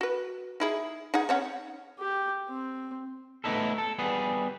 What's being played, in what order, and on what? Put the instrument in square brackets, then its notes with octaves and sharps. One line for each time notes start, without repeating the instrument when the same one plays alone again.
[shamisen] F#4 B4
D#4 E4 G#4
D#4 G#4 F#5
C4 C#4 F#5
[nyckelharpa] G4
C4
[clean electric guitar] A3 B3 C4 D#4 E4 A4
A4
G3 B3 G#4